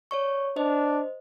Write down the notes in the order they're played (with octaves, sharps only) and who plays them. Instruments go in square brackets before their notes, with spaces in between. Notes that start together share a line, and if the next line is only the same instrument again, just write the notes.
[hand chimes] C#5 D5 C#6
[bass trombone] D4 [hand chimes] C5 D#5